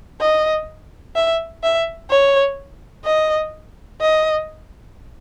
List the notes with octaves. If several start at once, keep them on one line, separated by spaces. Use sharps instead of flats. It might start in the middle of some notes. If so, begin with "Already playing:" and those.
D#5
E5
E5
C#5
D#5
D#5